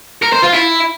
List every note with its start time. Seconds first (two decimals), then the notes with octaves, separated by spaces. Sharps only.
0.22 A#4
0.33 C5
0.43 F4
0.53 E4